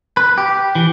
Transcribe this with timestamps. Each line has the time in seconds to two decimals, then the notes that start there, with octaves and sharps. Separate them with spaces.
0.17 B4
0.38 G4
0.75 E3